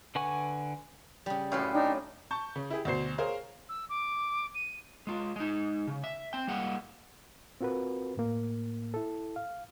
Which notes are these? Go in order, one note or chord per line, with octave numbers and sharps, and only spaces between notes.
D3 B4 F#5 G#5 C#6
C#3 G3
F#2 A2 C#4 B4 F5 C6
D4 D#4 G5
A5 C#6 G6
C#3
E4 G4 G#4
D2 B2 C5 C7
G#4 A#4 C5 C#5 F5
E6
D6
D#7
G#3 F4
G#3 D#4
C#3
E5
C4 G5
G3 G#3 A#3 F#5
C4 F4 F#4 A#4 B4
A2 A#3
E4 A4
F5